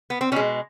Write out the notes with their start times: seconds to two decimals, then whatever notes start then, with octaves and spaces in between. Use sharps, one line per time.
0.10 B3
0.21 C4
0.32 B2 C#4
0.36 G#3